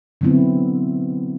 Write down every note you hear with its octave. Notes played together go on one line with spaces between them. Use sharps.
D3 F#3 B3 C4 E4